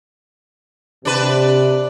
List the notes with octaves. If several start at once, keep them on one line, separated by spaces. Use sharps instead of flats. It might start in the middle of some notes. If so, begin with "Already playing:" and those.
C3 D4 B4